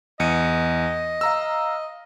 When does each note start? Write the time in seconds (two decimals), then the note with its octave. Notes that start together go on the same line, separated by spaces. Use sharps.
0.20 E2 D#5 C#7 D#7
1.21 F5 A#5 E6